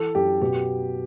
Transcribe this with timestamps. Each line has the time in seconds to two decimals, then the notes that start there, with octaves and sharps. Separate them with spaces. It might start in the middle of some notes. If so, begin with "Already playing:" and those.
Already playing: E3 A4
0.15 F#2 G4
0.41 B2 G4